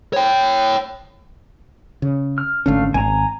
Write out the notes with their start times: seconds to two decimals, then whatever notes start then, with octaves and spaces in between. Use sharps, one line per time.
0.13 C#5 G5
2.02 C#3
2.38 F6
2.66 G#1 D3 A3 C#4 F5
2.94 G#1 G#5 A#5